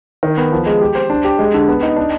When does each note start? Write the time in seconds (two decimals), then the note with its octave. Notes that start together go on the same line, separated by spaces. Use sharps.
0.23 D#3
0.37 B3
0.52 F3
0.66 G#3
0.81 G4
0.95 C5
1.10 D4
1.25 G4
1.39 G#3
1.54 D3
1.68 B3
1.83 D#4
1.96 D4